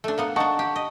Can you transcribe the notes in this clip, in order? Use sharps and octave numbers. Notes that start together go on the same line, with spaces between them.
A3 D4
A#3 B3 F#5
D4 D#4 F#5 A5 C#6
G4
D#5